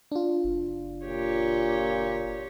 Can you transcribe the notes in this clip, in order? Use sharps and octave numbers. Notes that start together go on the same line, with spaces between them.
D4 F4
F#1
A#2 G4 C#5